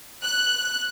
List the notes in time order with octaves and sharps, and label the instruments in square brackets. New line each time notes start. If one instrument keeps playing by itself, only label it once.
[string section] F#6